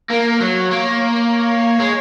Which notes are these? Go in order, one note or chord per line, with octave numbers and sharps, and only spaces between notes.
A#3 A#4
F#3 C#5
A#3
C#5
G#3